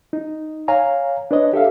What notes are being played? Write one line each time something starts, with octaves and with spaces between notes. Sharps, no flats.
D#4
C#5 F5 G#5 A#5
D4 B4 C#5 D#5
G4 A4 E5 F5